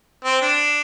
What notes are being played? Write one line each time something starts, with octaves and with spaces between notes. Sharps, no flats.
C4
D4